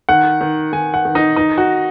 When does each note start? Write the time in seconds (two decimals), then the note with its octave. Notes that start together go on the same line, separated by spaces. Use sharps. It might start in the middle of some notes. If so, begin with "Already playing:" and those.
0.09 D#3 F#5
0.41 D#3
0.72 D#3 G#5
0.94 F#5
1.05 D#3
1.15 D#4
1.36 D#3 D#4
1.58 F#4